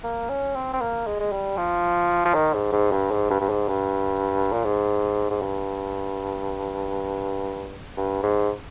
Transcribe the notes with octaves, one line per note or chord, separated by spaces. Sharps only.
A#3
C#4
C4
C4
A#3
G#3
G#3
G3
F3
F3
D#3
G#2
G#2
G2
G#2
G2
G2
G#2
G2
A#2
G#2
G#2
G2
G2
G#2